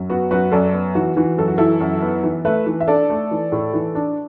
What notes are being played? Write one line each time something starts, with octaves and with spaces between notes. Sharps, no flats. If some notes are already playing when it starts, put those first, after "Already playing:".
Already playing: F#2
B3 F#4
F#2 F#4 B4
F#2 A4 D5
B3
E3 F#4
E3 F#4
F#2 A4
F#4
E3 E4 A4
F#2
B3
E3
A3 B4 E5
E3
E5
D4 A4 D5
A3
E3
A2
E3
D4